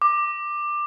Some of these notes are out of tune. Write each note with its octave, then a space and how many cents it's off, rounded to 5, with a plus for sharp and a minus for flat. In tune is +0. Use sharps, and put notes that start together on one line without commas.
D6 +15